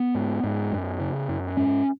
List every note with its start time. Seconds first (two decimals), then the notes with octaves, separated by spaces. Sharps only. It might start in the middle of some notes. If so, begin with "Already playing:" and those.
Already playing: B3
0.14 G#2
0.44 G#2
0.72 F#2
1.00 C#3
1.29 F#2
1.57 G#2 C#4